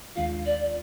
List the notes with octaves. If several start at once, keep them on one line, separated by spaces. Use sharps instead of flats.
D#2 D#3 G#3 D4 F4 F5
D5